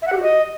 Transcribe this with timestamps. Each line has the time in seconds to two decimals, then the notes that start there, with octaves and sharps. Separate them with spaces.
0.02 E5
0.07 F#5
0.12 G4
0.17 F#4
0.22 D#5